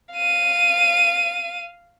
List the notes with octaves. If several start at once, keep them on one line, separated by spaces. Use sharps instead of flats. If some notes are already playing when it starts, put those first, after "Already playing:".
F5 D#7